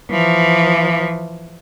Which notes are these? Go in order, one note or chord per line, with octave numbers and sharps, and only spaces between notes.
E3 F3